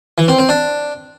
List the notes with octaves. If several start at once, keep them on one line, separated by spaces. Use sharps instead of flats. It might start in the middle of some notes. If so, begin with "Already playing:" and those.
E3
C4
C4
D4